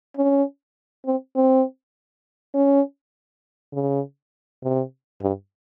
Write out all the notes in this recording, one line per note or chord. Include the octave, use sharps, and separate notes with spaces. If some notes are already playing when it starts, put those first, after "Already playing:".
C#4
C4
C4
C#4
C#3
C3
G2